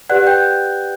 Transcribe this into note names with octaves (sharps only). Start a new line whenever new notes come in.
G4 B4 D5 F#5 F#6
G5 G6